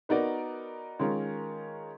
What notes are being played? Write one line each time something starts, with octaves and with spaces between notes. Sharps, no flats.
B3 D#4 F#4 A#4 D5
D#3 G#3 C#4 F4 A#4